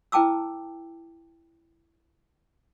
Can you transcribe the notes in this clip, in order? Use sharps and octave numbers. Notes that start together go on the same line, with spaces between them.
E4 B4 G5 A5 D6 E6